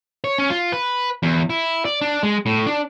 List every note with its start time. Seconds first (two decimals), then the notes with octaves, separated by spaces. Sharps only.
0.24 C#5
0.38 C#4
0.50 F4
0.72 B4
1.23 E2
1.50 E4
1.85 D5
2.01 D4
2.23 G#3
2.46 A2
2.67 D4